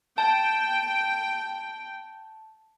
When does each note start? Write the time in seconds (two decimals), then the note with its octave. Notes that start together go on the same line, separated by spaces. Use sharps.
0.18 G5 A5